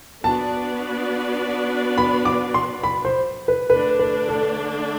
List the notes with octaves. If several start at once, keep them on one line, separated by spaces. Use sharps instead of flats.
B3 D4 F#4 B4 D5 A5
B5
D6
C6
B5
C5
B4
D3 A3 D4 B4
B4
A4